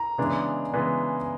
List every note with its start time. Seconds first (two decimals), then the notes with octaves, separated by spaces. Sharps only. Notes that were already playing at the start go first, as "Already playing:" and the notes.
Already playing: A#5
0.18 C#3 E3 G#3 B3 D4
0.73 C#3 E3 G#3 B3 D4